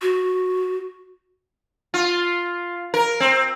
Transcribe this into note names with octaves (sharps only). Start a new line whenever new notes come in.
F#4
F4
A#4
C4